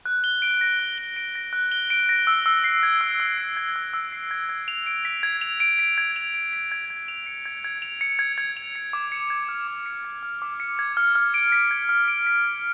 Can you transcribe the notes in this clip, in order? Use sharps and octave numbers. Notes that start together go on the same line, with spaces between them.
F#6
G7
D7
A#6
F#6
G7
D7
A#6
F#6
G7
D7
A#6
E6
E6
C7
G#6
E6
E6
C7
G#6
E6
E6
C7
G#6
G#6
F7
D7
B6
G#6
F7
D7
B6
G#6
F7
D7
B6
G#6
G#6
F7
C#7
G#6
G#6
F7
C#7
G#6
G#6
F7
C#7
D6
C#7
G#6
F6
D6
C#7
G#6
F6
D6
C#7
G#6
F6
F6
D7
B6
G#6
F6
D7
B6
G#6